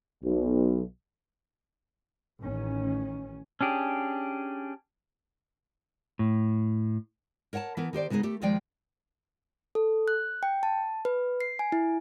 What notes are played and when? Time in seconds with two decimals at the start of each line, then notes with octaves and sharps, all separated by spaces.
0.23 B1
2.40 A1 D#3 C#4
3.61 C#4 D4 G4 G#4
6.19 A2
7.53 A#4 C#5 F#5 G5 A5
7.77 E3 B3 A#4
7.93 D#3 G4 C5 D5
8.10 C#3 G#3 B3 D#4 G#4
8.23 A3 G4
8.42 D#2 D#3 F3 G#3 D5 G5
9.75 A4
10.08 F#6
10.43 G5
10.63 A5
11.05 B4
11.41 C7
11.59 G#5
11.72 E4